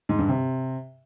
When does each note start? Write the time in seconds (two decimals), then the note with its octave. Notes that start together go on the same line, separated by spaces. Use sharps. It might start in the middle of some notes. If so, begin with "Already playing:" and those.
0.09 G#2
0.19 G2
0.28 C3